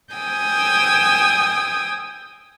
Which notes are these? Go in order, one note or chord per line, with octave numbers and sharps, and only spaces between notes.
G5 G#5 D#6 E6